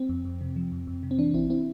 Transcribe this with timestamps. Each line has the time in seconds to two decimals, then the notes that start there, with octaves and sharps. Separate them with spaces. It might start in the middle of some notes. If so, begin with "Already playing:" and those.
Already playing: C4
0.09 F2
0.25 F2
0.41 C3
0.56 F3
0.72 F2
0.87 F2
1.03 C3
1.11 C4
1.18 E3 D4
1.34 A1 C4 E4
1.50 C4 E4